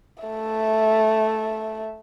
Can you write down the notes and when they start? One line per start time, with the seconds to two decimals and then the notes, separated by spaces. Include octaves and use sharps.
0.24 A3 E5